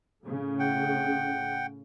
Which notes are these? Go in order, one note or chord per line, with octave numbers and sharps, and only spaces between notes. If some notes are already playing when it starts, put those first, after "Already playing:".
A2 C#3
F#5 G5